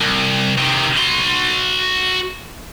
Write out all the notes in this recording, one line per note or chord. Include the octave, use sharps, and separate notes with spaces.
C2
C3 D#3
F#4 C6